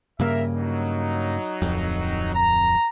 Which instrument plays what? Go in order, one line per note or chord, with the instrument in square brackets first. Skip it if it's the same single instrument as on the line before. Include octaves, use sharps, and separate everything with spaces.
[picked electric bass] G2 C#3 A#3 [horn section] A#4 E5
[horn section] F#3 D#4
[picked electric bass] D1 F2
[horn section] A#5